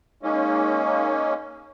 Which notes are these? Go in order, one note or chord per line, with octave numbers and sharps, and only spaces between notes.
G#3 A#3 C#4 D#4